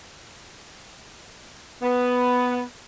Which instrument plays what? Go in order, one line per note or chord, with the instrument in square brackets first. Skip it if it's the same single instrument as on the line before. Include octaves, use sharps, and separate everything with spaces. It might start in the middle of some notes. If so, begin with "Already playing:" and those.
[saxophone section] B3